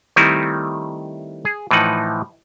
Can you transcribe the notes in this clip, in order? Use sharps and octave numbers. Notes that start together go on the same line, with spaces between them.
D#3 G3 A3 C4 D#4 E4
G#4
A2 E3 F3 D#4 F#5